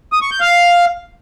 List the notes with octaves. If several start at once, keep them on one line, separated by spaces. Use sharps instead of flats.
D#6
C#6
G6
F5